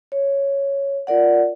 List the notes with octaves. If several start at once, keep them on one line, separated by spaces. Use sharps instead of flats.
C#5
F4 A#4 D5 F#5